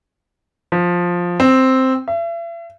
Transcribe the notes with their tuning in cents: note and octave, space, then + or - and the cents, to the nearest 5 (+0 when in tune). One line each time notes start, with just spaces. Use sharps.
F3 +10
C4 +0
E5 +40